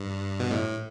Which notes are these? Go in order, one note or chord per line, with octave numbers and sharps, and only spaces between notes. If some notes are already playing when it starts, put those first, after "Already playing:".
Already playing: G2
B2
A2